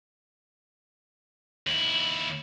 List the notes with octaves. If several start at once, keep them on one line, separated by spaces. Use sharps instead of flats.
D#2 E4 F#7